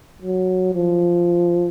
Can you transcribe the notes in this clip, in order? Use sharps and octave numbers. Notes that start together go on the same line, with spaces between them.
F#3
F3